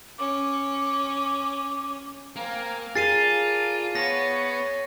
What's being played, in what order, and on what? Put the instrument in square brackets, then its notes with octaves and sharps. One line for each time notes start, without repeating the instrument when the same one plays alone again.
[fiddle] C#4 [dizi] D6
[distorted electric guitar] A#3 [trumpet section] C4 A#4 G#5
[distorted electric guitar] F4 [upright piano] G#4 [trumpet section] A#4 D5 A5 [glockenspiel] A6 C7 D#7
[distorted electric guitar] B3 [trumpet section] C#5 [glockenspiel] A#6